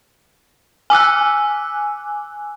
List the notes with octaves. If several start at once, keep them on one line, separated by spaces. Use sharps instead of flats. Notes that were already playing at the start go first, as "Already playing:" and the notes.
G#5 D6 E6 F#6